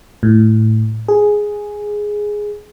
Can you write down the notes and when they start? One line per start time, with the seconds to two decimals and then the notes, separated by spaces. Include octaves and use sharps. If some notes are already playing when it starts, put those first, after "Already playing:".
0.23 A2
1.08 G#4